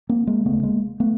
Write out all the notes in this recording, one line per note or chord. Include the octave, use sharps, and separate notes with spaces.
A#3 C4
G#3 A#3
E1 D2 C#3 A3 B3
G#3 A#3
A3 B3